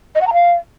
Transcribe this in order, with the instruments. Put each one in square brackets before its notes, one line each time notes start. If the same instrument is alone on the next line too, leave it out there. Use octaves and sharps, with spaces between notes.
[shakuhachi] D#5
F#5
A#5
F5